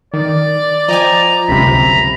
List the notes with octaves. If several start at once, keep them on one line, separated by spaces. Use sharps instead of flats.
D#3 D5
F3 D#5 G5 G#5 A#5
G1 C#2 F#2 C3 B5